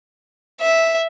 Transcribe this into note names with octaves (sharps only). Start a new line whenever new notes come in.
E5